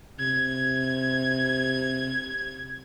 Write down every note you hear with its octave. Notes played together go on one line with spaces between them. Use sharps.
C3 G#6